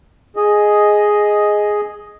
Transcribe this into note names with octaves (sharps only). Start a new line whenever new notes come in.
G#4 D#5